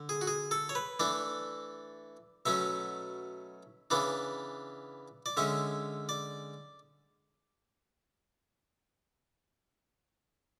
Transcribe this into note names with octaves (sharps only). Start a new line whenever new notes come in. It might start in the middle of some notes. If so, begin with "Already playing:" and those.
Already playing: D3
G#4
F#4
G#4
A4
C#5
B4
E3 A3 D4 D5
B2 F#3 A3 C#4 E5
C#3 E3 B3 D4 D5
D5
D3 G#3 C#4 E5
D5